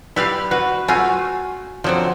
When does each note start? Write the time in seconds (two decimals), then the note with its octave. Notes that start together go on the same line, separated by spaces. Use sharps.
0.16 G3 E4 G4 B4 F5
0.51 F#4 B4
0.88 A3 F4 F#4 G#5
1.84 D3 F3 F#3 C4